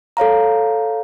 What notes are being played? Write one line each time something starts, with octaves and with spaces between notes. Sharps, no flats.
A4 C#5 F5 A#5